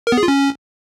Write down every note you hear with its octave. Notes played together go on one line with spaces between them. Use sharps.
A#4
B3
G#4
F4
C#4